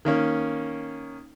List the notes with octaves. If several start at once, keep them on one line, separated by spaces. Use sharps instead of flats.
D#3 A#3 C#4